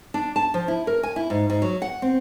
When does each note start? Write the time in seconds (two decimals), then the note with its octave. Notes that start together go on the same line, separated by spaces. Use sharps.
0.14 D4
0.36 A5
0.54 F3
0.68 E4
0.87 A#4
1.03 G#5
1.16 E4
1.30 G#2
1.50 G#2
1.62 F#3
1.82 F#5
2.02 C4